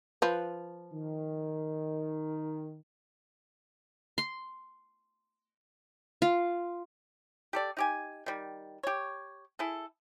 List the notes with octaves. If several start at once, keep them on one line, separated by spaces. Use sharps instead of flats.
F3 B4
D#3
C6
F4
G4 A4 D5
D#4 G4 G#5
D#3 G3
G4 C#5
E4 G#4 A4